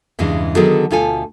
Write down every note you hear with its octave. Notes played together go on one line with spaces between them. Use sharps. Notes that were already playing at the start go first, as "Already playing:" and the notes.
E2 G2 C#3 E3 G#3
D3 D#3 F#3 B3 G#4 A4
D2 B2 F4 A4 G#5